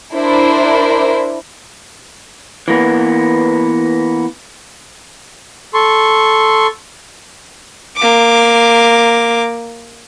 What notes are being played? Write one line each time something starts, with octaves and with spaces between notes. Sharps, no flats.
D4 E4 A#4 C5
E3 A#3 B3
A4 C6 C#6
A#3 D6